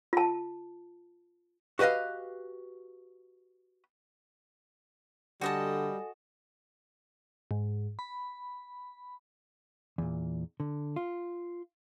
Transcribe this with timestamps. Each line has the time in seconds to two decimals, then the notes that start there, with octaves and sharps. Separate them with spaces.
0.13 F4 A5
1.79 F#4 G4 B4 D#5 F5
5.41 D3 G3 F#4 A4 D#5 G#5 A5
7.51 G#2
7.99 B5
9.98 E2 A#2
10.60 D3
10.96 F4